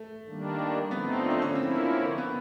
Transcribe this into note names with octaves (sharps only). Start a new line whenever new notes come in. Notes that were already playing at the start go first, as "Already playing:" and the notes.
Already playing: A3
D#3 G3 A#3 D4
D3 F3 A3 B3 C4 D#4
D4
C#4
D3 F3 A#3 C4 C#4 E4
B3